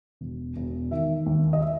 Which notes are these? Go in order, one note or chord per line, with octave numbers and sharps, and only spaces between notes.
E1
E1
D#3 E5
D#2
D#5
E5